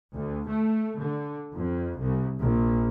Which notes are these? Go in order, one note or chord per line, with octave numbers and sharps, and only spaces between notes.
D2
A3
D3
F2
C2
A#1